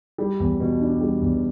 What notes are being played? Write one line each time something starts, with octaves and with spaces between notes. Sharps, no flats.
G3
E2
B2
D4
G3
E2